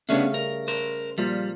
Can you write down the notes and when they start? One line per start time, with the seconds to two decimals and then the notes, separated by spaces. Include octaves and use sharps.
0.09 C#3 G3 A3 B3 C#4 D4
0.34 A#4
0.68 A#4 C5
1.18 A#2 F3 G3 F4